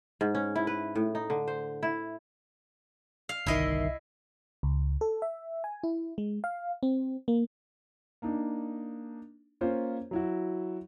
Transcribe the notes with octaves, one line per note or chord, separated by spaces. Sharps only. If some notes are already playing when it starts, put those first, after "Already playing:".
G#2
C#4
E4
B4
A2
D#4
D3
C5
E4
F5
G1 C2 D#3 E4 D#5 E5 C7
C#2
A4
E5
G#5
E4
G#3
F5
C4
A#3
A#3 D4 D#4
A#3 C#4 F4 C5
F#3 E4 F#4